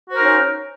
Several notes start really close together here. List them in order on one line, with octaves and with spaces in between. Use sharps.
F#4 C5 A#4 D#4 C#4